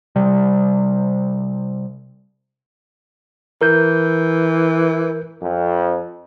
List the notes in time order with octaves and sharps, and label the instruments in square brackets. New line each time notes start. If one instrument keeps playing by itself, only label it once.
[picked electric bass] C3 G3
[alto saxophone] E3 [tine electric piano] A#4 G6
[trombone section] F2